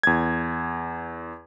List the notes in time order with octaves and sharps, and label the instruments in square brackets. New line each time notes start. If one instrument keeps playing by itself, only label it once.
[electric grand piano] E2 G#6